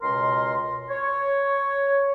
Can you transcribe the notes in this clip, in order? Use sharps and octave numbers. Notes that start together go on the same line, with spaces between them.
C#2 B2 A#4 C6
C#5